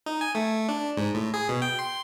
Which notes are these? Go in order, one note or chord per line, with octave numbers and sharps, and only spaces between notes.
D#4
G#5
A3
D4
G#2
A2
G#4
B2
G5
C6